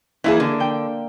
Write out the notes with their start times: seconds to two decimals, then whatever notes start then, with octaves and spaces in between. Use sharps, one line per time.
0.24 E3 A#3 E4 G#4
0.40 D3
0.60 G5